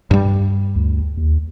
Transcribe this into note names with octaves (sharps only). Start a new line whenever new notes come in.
G2 G3
D2
D#2